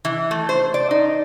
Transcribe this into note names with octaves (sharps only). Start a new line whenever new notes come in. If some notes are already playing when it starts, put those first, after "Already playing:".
E3
A3
C5
D5
D#4